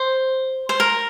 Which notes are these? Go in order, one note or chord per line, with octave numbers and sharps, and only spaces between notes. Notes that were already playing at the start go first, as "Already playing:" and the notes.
Already playing: C5
C5
A#4